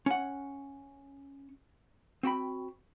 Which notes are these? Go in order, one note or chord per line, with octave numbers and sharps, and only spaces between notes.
C#4 F#5
C4 F#4 G5 B5